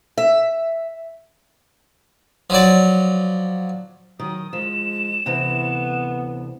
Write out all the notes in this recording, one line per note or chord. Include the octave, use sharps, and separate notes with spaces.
E5
F3 F#3 D5
D#3 F#3 D#6
F3 G#3 E7
D2 C3 E3 B3